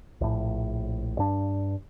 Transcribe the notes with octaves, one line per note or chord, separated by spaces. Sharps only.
A#1 A2
G2 D4